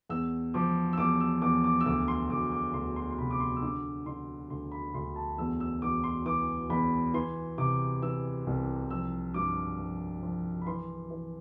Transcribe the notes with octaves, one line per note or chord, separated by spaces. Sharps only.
E2 E6
F3 D6
E6
E2 D6
E6
E2 D6
D6
E6
D2 D6
C6
D2 D6
D6
D2 C6
C6
C6
C3 B5
D6
C6
E6
D3 D6
D3 C6
D2 C6
B5
D2 C6
A5
E2 E6
E6
E2 D6
C6
E3 D6
E2 B5
E3 C6
C3 D6
E3 E6
C2
F3 E6
G2 D6
F3
F3
B5
E3 C6
E3